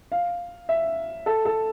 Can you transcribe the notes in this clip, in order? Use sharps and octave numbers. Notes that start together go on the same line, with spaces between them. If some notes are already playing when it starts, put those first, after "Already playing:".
F5
E5
A4
A4